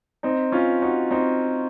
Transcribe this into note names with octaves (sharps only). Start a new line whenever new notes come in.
C4 D#4
C#4 F4
D#4 F#4
C4 D#4